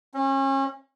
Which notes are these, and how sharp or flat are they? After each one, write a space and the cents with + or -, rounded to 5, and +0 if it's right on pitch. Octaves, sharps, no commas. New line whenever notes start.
C#4 -35